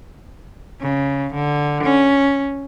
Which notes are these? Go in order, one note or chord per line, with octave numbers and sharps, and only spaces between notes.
C#3
D3
C#4